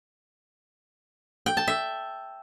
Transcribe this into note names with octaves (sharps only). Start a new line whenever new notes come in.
G5
A5
E5